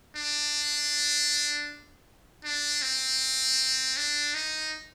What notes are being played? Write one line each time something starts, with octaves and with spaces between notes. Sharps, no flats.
D4
D4
C4
D4
D#4